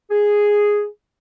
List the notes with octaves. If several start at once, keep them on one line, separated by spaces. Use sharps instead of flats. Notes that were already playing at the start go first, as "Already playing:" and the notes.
G#4